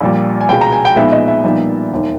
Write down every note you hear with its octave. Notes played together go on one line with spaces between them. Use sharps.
A#1 A#2 G3
G#5
C#2 B2 G#3 G5
A#5
G#5
G5
A#1 A#2 G#3 B3 D#4 E5
D#5
E5
A#1 A#2 G3 B3 D#4
E1 D#2 D#3